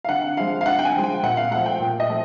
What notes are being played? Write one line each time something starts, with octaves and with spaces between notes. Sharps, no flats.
F5
D3 F#5
F3 G#3 F5
F5
D3 F#5
G5
G#5
F3 G#3
G5
A#2 F#5
F5
F3 A3 F#5
G5
A#2
D#5
F3 A3